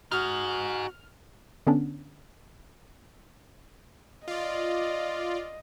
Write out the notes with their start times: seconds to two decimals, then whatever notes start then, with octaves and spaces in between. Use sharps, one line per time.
0.11 D#4 F#4 G#4 F6
1.67 D3 B3 C#4 D4
4.28 F4 D5 D#5